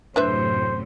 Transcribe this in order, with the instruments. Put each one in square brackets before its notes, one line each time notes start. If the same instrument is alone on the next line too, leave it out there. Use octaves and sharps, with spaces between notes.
[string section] F#2 A2 C3 [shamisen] D4 B4 E5 [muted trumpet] C5